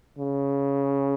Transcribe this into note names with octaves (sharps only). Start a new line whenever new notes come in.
C#3